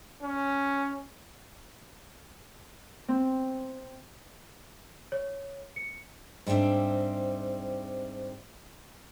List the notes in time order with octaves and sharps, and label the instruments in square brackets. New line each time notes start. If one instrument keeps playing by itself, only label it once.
[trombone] C#4
[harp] C4
[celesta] C#5
C#7
[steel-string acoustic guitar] G#2 G3 C4 D4 E5